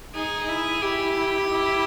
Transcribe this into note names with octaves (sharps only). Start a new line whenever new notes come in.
D#4 G#4
E4
E4 G4
E4